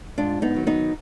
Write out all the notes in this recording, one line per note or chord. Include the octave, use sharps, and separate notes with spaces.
G#2 D4 F4
B3 D#4
D#3 F#3
B3 D#4